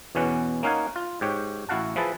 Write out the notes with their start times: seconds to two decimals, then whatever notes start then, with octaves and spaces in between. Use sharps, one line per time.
0.15 E2 B2 E3 C#4 F#5
0.63 A#3 C#4 D#4 F5 F#5 G#5
0.96 F4
1.21 G#2 G4 C#5
1.69 A1 E4 F#4 F5 F#5 A5
1.96 F3 E4 G#4 B4 A5